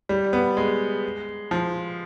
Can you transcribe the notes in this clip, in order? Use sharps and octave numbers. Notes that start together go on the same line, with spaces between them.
G3
B3
G#3
F3